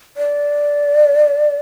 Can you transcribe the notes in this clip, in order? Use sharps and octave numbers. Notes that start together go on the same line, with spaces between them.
D5